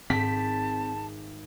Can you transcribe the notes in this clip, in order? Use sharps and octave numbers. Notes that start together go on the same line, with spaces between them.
G#1 G#2 C4 A5 B6